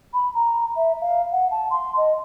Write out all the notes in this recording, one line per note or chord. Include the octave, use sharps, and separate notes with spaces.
B5
A#5
E5
F5
F#5
A5
C6
D#5